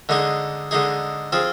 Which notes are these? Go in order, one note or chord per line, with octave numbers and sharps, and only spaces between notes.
D3 G#3 D#4 G#4
D3 G#3 D#4 G#4
F3 C4 F4 G#4